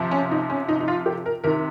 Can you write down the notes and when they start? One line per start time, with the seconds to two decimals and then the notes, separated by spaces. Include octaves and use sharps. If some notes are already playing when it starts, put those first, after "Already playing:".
Already playing: C3 F3
0.11 C#4
0.31 D#4
0.50 C#4
0.69 D#4
0.80 D#4
0.88 F4
1.06 G4
1.26 A#4
1.44 C3 D#3 A#4